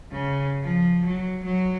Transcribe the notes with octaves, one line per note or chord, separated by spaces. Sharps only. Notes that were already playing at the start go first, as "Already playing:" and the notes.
C#3
F3
F#3
F#3